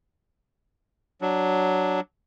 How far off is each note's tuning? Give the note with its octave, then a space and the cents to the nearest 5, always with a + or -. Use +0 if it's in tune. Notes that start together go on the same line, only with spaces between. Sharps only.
F#3 +5 D4 +0